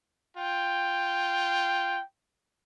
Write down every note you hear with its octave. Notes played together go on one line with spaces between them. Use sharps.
F4 G5